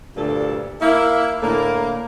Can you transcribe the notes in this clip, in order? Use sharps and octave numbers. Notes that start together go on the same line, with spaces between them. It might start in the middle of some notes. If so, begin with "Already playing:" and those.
D2 G2 A#2 A4
A#3 E4
A2 D3 A#3